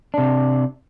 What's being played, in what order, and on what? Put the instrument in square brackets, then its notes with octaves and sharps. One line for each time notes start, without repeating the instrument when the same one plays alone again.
[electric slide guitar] C3 D4